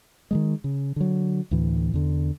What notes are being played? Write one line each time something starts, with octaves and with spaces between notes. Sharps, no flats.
D#3 F#3 G#3
C#3
D3 F#3
D2 A2 E3
E2 D3